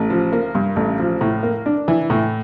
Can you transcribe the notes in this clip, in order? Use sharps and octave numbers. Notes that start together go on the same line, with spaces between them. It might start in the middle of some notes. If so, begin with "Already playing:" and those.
Already playing: A1
F3
A#3
G2
A1
F3
A2
A#3
D4
E3
A2